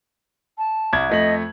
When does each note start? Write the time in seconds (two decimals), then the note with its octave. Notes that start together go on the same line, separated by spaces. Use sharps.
0.58 A5
0.93 C2 G#6
1.10 F2 A3 D#5 F#7